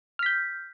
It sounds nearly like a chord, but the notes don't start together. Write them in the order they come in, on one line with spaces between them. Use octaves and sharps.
F6 B6 G6